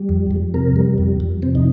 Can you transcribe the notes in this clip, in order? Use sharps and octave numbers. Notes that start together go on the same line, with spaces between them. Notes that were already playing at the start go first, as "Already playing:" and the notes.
Already playing: G3
F2
F2
C3 A#4
G3
F2
F2
C3 C4
D#4